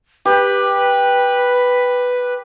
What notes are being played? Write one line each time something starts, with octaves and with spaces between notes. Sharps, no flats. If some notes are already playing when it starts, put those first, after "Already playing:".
G4 B4